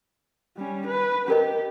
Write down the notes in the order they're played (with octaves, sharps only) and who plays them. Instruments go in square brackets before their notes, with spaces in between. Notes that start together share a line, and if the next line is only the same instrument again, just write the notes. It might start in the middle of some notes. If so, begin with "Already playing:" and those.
[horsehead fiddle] G3 C#4
B4
[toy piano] C#4 A#4 D#5 [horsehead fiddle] G4